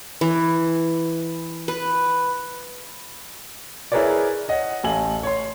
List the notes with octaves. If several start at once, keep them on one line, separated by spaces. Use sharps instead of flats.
E3
B4
E4 G#4 A#4 B4 C#5 D5
C#5 D#5 F#5
A1 A3 F5 G#5 F#7
C#5 C6